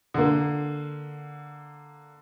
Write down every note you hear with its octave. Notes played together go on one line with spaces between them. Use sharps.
D3 A#3